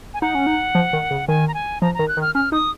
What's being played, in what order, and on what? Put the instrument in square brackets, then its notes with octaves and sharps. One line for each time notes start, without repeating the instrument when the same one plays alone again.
[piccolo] G#5
[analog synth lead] D#4 [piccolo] F#5
[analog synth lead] C#4
D#4
F3
D#3
C#3
[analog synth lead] D#3 [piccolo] G#5
[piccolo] A#5
G#5
[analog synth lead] F3 [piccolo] A#5
[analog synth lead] D#3 [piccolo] A#5
[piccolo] F#6
[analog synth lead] D#3
[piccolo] F6
[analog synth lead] C#4 [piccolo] F6
[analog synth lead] D#4 [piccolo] D#6